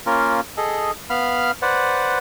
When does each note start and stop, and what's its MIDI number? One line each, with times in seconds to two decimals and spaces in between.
0.06 0.40 58
0.06 0.40 61
0.06 0.40 65
0.06 0.40 70
0.57 0.91 68
0.57 0.91 69
0.57 0.91 75
1.10 1.51 59
1.10 1.51 77
1.10 1.51 83
1.10 1.51 89
1.62 2.18 71
1.62 2.18 72
1.62 2.18 74
1.62 2.18 78